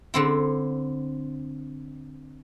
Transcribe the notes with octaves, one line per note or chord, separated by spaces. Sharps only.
D3 C4 E4